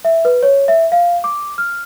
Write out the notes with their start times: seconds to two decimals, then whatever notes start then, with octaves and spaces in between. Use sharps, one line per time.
0.05 E5
0.25 B4
0.43 C#5
0.68 E5
0.92 F5
1.24 D6
1.58 F6